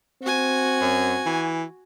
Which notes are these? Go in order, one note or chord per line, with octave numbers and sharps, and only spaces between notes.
C4 F#4 G#5
F#2
E3